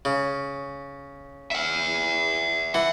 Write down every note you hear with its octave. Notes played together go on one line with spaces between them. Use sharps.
C#3
E5 F#5
E3 F#5